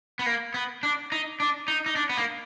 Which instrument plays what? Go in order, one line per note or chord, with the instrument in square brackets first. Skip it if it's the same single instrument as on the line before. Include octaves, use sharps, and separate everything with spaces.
[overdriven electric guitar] B3
A#3
B3
D4
D#4
D4
D#4
D#4
D4
B3
A#3